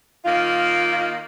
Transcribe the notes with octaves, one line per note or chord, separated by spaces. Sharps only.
D#3 A#3 F4